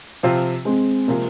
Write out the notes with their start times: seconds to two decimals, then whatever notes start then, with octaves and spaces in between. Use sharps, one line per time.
0.23 C3 F3 C4 F4
0.65 G#3 C4
1.08 C3 F3 G#3 A#3 F4